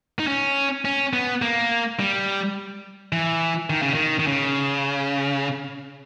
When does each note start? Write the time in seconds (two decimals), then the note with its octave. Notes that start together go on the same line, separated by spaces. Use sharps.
0.19 D#4
0.27 C#4
0.85 C#4
1.13 B3
1.42 A#3
1.99 G3
3.12 E3
3.70 D#3
3.82 C#3
3.94 D#3
4.19 D#3
4.27 C#3